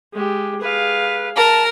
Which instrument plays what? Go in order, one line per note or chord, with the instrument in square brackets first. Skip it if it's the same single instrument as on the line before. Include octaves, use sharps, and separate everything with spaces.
[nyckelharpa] G#3 G4
[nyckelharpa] G#4 F5 [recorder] B4
[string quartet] A#4 [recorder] A5